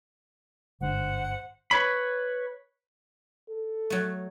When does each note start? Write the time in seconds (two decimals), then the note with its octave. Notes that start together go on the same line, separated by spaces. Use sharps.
0.81 G1 G#2 D3 C5 F#5
1.71 B4 C#5 B5
3.49 A4
3.90 F#3 A3